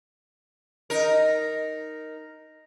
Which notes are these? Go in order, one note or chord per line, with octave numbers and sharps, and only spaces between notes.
D#4 A#4